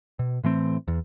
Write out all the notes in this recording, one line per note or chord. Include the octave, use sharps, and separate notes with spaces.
B2
A2 E3 A3 C4
E2